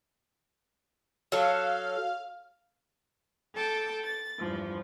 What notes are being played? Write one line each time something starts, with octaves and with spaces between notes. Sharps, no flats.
F#3 A4 F5
A4 G5 A5 D6
A6
E2 G2 F3